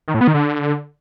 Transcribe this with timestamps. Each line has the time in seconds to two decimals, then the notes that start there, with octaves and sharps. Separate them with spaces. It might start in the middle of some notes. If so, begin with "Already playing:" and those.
0.08 D#3
0.14 A2
0.21 B3
0.28 D#3
0.34 D3